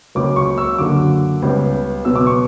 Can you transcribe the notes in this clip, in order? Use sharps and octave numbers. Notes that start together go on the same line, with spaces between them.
C#2 C#3 F#3 A#3 D6
C#6
E6
F#2 D3 A#3 D6
C#2 C#3 G3 B3
B2 F#3 B3 E6
D6
C#6